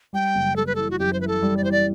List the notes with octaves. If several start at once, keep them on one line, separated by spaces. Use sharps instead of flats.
G3 G5
F#1
G3 A4
B4
E3 A4
F#4
F#2 G4
C5
E3 B4
A4
G3
D5
E3 C5
D5